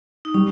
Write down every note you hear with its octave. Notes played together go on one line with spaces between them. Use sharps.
D#4
G3 C#4